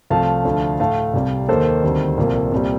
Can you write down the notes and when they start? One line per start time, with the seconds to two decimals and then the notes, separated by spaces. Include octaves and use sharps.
0.10 C2 C3 F3 A3 F5 A5
0.45 D2 D3 F3 A3
0.79 A2 A3 F5 A5
1.14 C2 C3 G3
1.48 D#2 D#3 A#3 A4 C5
1.83 D2 C3 D#3 G3
2.18 C2 A#2 F3 A#3
2.52 C2 A#2 G3